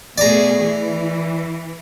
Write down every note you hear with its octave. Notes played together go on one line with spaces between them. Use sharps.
B2 A3 G#4 D5 A#5
E3